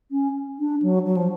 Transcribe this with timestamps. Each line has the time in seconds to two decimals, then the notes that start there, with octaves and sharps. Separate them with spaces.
0.11 C#4
0.59 D4
0.82 F#3
1.06 F#3
1.17 F3